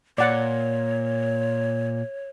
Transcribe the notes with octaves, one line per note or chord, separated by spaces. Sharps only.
A#2 C#5 D5 F#5